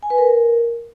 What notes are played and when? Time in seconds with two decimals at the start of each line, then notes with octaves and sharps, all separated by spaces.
0.03 G#5
0.10 B4
0.18 A#4